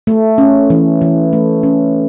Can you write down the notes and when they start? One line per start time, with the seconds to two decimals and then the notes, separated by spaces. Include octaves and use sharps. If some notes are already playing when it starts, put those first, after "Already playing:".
0.07 A3
0.38 C#4
0.70 E3
1.01 E3
1.33 A3
1.63 C#4